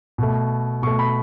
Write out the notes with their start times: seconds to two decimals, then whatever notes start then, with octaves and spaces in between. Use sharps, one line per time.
0.18 B2 A3
0.82 B2 C#6
0.87 A3
0.99 B5